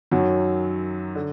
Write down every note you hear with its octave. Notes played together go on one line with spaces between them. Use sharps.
F#2 D#3 F#3 F#4
D3